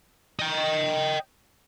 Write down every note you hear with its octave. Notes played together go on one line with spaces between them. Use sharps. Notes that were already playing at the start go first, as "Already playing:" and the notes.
D#5 G5